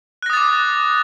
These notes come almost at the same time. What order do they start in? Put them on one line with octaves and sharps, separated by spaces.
F#6 A#6 D#6 A6 D6